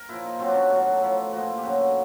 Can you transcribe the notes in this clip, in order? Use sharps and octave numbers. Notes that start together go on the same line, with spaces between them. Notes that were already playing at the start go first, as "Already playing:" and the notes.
Already playing: A#4
A#2 F3 E4
D#4
B2 F#3 C4
D4
C#4
A2 F#3 D4
D#4
A2 F3 E4
A#2 F3 F#4
E4
G4
F#2 D3 F#3 F#4